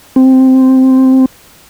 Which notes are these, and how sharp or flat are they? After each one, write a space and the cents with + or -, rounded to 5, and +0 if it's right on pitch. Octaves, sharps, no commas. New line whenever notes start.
C4 +0